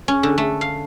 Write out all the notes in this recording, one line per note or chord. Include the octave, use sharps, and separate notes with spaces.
C#4
D3
A3
F5